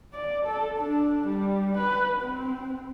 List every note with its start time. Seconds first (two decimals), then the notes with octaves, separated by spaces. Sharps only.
0.13 D5
0.46 A4
0.78 D4
1.27 G3
1.77 B4
2.21 C4